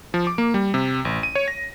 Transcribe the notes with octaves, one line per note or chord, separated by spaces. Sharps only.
F3
D6
A#3
G3
C3
A1
D#7
C#5
A#6